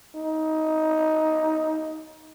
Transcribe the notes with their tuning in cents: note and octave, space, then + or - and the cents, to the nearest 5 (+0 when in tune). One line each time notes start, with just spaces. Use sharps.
D#4 +15